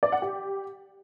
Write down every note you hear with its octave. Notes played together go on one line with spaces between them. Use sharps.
D5
F#5
G4